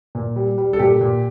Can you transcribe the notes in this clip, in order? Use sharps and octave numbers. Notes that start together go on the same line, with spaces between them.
A#2
G3
G3
A4
A#2 G4
A#2